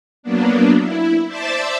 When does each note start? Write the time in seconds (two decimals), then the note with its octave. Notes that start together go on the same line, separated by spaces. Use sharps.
0.23 F#3 A#3 B3 D4
0.81 E4
1.27 C5 D5 E5 A5 D6 E6